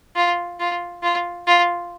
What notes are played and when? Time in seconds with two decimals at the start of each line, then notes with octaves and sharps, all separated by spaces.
0.16 F4
0.60 F4
1.03 F4
1.47 F4